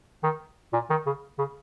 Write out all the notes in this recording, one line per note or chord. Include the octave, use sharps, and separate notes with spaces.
D#3
A#2
D#3
C#3
C#3